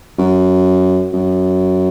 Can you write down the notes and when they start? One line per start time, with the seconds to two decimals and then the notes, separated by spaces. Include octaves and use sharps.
0.19 F#2
1.13 F#2